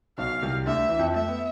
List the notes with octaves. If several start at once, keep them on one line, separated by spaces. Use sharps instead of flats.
B1 B2 F5
C2 C3
D2 D3 E5
E3
F2 F3
A3 E5
B3